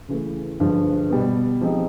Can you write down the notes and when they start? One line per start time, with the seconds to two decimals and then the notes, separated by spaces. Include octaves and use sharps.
0.08 C#3 E3 A3
0.60 G2 D3 F3 G#3
1.10 B2 G3 B3
1.61 F3 G#3 C4 D#4